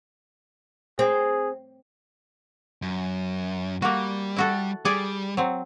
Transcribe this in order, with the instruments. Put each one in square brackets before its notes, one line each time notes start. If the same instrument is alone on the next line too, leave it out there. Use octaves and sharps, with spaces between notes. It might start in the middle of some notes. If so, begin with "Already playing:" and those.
[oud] C4 [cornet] G#4
[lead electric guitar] F#2
[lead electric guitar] G3 [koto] A#3 F#4
[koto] E4 F#4 A4
[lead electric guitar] G3 [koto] G#4 D5
[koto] F#3 C4